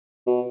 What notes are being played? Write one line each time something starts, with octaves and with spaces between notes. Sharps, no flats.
B2